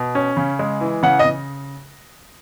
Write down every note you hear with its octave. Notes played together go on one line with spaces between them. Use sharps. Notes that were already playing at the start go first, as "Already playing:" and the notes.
Already playing: B2
C#4
C#3
G#3
E3
C#3 F#5
D#5
C#3